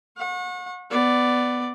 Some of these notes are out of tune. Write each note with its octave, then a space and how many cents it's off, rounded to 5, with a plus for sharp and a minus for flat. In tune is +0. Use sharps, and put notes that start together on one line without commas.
F#5 -35 C#6 -35
B3 +10 D5 +0